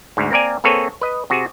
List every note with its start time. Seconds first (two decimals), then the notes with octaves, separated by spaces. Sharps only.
0.17 D2 G#2
0.31 A#3 C4 A#4 D5 G#5
0.64 A#3 C4 G#4 A4 B4 C#5
1.01 B4 D#5
1.30 C3 F#4 G#4